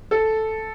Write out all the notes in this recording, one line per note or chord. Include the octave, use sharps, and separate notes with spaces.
A4